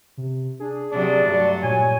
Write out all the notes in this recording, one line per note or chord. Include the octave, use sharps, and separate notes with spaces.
C3
D4 G#4
C3 F#3 D4 D5
G2 F#3 A3
A#2 C#5 G#5